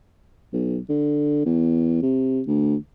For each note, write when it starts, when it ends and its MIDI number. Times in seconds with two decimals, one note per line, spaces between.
0.53 0.79 35
0.89 1.42 50
1.45 2.00 40
2.02 2.41 48
2.47 2.75 38